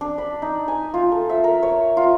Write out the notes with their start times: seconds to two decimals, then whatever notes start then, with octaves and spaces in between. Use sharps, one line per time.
0.01 D4
0.18 B5
0.42 D#4
0.68 G#5
0.94 F4
1.12 A4
1.29 E5
1.44 A#4
1.63 C#5
1.97 F4